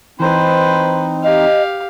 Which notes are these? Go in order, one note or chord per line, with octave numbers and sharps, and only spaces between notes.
E3 C4 D#4 B4 C5
G4 D#5 F5